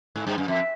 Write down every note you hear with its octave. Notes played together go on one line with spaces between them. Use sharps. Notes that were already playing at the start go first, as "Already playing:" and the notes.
G#2
G2
F#2
F2 E5